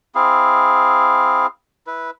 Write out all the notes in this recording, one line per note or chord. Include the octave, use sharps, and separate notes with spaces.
C4 E4 G#4 F5
E4 B4